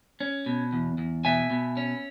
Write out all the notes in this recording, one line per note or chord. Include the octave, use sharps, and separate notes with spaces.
C#4
B2
E2
E2
B2 E5 G#5
B2
C#4